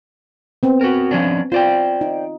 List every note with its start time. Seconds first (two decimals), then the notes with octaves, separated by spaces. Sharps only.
0.63 B3 C4
0.81 F#4 A#4
1.11 F3 C#4 D4
1.52 F4 C5 D5 G5
2.01 D#4